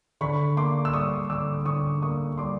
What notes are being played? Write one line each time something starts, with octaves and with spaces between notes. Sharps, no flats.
D3 B5 C#6
A#3 C6 D6
E6
G3 C#6 D#6
D3 D6 E6
D3 C#6 D#6
A#3 C#6 D#6
G3 C6 D6